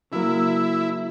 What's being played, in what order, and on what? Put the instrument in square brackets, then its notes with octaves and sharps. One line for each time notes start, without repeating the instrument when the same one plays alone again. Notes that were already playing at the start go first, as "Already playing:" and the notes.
[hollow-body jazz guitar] C#3 F#3 A#3 [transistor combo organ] E4